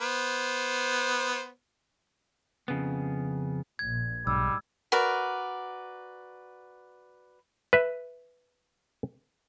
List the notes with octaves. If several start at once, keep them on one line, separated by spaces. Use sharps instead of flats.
B3 C5
F2 C#3 B3
A#1 A#2 G#6
B1 G#2 G3 E6
F#4 A#4 B4 D5
B4 E5